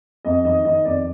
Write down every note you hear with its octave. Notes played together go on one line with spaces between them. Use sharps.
F2 D#5
D#3 D#5
D#3 D#5
F2 D5